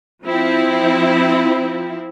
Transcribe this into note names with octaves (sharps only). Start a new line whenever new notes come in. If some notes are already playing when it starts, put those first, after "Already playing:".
F3 C4 E4